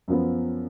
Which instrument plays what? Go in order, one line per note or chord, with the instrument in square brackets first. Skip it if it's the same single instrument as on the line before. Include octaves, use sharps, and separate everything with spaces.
[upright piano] F#2 F3 B3